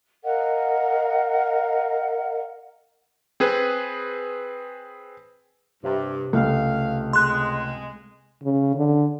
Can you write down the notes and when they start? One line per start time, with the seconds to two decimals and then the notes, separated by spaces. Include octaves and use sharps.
0.24 A#4 D#5 F5 F#5
3.40 C4 G#4 B4
5.83 G2 C3
6.33 C#2 A3 F5
7.13 G#3 C6 F#6
8.43 C#3
8.76 D3